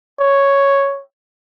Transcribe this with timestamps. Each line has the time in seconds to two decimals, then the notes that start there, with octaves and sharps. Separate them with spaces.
0.19 C#5